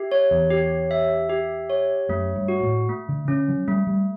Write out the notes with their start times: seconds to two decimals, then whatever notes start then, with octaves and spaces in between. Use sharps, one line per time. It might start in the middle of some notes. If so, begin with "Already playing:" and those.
Already playing: G4 E5
0.12 C#5
0.31 E2
0.50 G4
0.91 E5
1.30 G4
1.70 C#5
2.09 F#2 A3
2.36 G2
2.48 F#4
2.63 A2
2.89 A3
3.09 D3
3.28 D3 C#4
3.48 F#3
3.68 G3 A3
3.87 G3